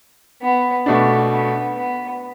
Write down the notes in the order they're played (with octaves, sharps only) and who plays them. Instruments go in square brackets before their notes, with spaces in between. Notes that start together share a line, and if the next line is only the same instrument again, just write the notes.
[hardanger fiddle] B3
[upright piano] B2 A3 D4 [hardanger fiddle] B3
[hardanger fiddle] B3
B3